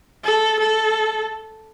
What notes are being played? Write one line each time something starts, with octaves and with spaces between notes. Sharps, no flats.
A4
A4